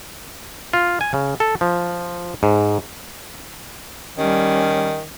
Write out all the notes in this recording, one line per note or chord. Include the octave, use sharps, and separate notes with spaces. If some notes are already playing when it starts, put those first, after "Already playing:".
F4
G#5
C#3
A4
F3
G#2
D#3 G3 C#4